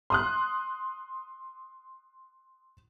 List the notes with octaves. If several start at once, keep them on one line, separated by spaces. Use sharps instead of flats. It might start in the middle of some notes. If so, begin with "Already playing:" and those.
C6 D#6 F#6